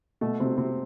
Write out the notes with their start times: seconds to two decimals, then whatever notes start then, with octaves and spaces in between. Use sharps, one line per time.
0.21 B2 A3
0.40 C3 C4
0.57 C3 C4